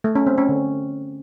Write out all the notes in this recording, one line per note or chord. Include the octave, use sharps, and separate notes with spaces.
A3
C#4
C4
C#4
D3